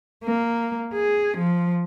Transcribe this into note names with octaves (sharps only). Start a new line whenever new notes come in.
A#3
G#4
F3